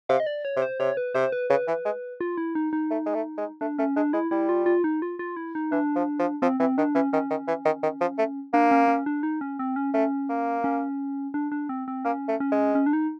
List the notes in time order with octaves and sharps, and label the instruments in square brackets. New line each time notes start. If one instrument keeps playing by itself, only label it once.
[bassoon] C3 [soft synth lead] F5
[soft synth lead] D#5
D5
C#5
[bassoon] C3
[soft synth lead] C5
[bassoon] C3 [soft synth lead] C#5
[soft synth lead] B4
[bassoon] C3 [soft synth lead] C5
[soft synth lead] B4
[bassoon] C#3 [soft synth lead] B4
[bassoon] E3
G#3
[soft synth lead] F4
E4
D#4
D#4
[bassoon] A3
G#3
A3
G#3
[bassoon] A3 [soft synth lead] D4
[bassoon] A3 [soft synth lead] C#4
[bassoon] G#3 [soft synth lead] D4
[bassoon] G#3 [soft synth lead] E4
[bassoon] G3 [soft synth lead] E4
[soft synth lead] F4
F4
D#4
F4
F4
E4
D#4
[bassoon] E3 [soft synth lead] D4
[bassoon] F3
F3
[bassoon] F3 [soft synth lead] C4
[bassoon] E3 [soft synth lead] C4
[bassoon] D#3 [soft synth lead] D4
[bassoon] E3 [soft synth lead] C#4
[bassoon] D#3 [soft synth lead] C#4
[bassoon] D#3
E3
D#3
D#3
F3
A3
[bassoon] A#3 [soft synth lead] D4
[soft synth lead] C#4
C#4
D4
D#4
C#4
C4
C#4
[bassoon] A3 [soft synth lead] C#4
[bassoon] A#3
[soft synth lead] C#4
D4
D4
C4
C4
[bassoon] A#3 [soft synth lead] C#4
[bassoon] A3
[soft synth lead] C#4
[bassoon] G#3
[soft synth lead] C#4
D4
D#4